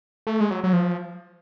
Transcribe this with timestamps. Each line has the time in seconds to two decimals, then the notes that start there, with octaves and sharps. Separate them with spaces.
0.27 A3
0.40 G#3
0.51 F#3
0.64 F#3
0.73 F3